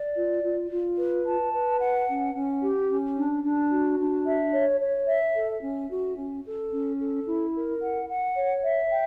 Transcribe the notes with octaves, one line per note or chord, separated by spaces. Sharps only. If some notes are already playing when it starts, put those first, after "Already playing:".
Already playing: D5
F4
F4
F4
B4
A5
B4
F#5
C#4
C#4
G4
C#4
D4
D4
F#4
D4
E5
C#5
C#5
E5
A4
C#4
F#4
C#4
A4
C#4
A4
E4
A#4
F#5
F#5
C#5
E5
G5